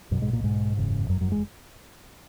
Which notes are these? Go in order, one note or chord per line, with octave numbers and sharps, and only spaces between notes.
B1 F#2 B2 F#3
G#2 G#3
A#2 A#3
G#2 G#3
F#1 E2 C#3
F#2 F#3
F#2 F#3
G#3